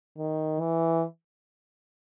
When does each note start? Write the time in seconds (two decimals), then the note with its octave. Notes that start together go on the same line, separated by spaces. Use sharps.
0.18 D#3
0.59 E3